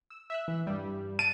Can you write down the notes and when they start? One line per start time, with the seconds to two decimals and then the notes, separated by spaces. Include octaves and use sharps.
0.10 E6
0.30 E5 E6 F#6
0.48 E3
0.67 G2 G3
1.19 A5 D7 D#7